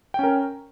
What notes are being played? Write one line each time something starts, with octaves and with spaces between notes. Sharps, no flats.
C#4 A#4 G5